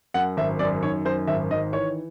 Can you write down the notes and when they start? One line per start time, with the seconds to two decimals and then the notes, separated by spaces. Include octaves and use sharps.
0.14 F#2 F#5
0.37 G#1 E5
0.59 F#2 D5
0.83 D#3 C#5
1.05 F#2 C5
1.27 G#1 E5
1.51 D#3 D#5
1.73 E3 C#5